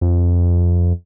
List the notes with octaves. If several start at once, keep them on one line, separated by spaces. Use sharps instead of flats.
F2